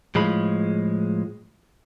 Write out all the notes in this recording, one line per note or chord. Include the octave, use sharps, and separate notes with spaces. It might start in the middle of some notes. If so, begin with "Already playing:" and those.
A2 F3 G#3 B5